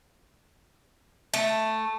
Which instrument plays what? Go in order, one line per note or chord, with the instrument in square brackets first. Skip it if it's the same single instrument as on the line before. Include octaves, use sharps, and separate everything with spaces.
[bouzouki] A3